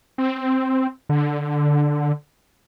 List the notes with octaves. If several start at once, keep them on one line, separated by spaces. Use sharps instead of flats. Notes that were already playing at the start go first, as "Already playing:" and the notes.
C4
D3